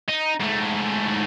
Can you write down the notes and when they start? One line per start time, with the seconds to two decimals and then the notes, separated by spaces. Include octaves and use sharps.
0.09 D#4
0.40 G#2 A3